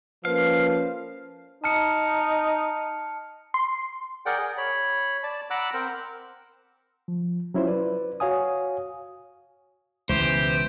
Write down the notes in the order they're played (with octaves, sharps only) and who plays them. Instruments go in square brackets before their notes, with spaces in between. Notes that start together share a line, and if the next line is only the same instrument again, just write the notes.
[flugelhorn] F3 [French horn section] A#3 C#4 B4 [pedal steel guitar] F5
[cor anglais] D#4 [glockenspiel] A5 F6 C#7
[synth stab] C6
[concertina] G#4 A#4 D5 F#5 G5
G#4
C#5 B5
D5 A5
F#5 A#5 B5 D6 E6 F#6
C4 A#4 C5
[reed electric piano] F3
F#3 C#4 E4 F4 C5
B4 D5
F#4 C#5 F5 G#5 D#6
[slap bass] C#2 B2 [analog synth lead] E3 [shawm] G4 [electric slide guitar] C5